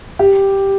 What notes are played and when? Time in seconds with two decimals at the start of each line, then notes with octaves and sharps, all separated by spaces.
0.19 G4